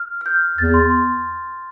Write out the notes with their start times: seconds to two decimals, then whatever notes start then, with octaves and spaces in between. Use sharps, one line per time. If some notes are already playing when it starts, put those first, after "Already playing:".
Already playing: F6
0.21 F6
0.26 G6
0.58 E2 A6
0.74 C6
0.90 C6